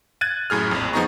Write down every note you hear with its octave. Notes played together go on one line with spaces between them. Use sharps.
F#6 G#6 A6 D#7
F#2 A2 G#4 F6
A#1 F2
F3 B3 D#4 G#4 A#5 C#6